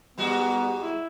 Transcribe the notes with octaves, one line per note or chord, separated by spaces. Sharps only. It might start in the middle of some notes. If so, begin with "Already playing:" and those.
G#2 G3 B3 F#4
E4